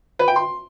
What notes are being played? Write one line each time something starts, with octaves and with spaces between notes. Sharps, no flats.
B4
G5
C6